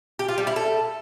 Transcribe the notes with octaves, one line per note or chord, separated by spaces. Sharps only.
G4
F4
G3
E4
A4